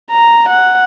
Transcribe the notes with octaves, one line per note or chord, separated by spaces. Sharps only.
A#5
F#5